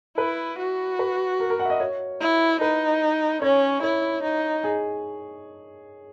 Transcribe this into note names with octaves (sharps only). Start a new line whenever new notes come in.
E4 B4
F#4
B4
A#4
A#4
F#5
E5
D#5
C#5
E4
D#4 B4
C#4 C#5
E4 C#5
D#4
G#4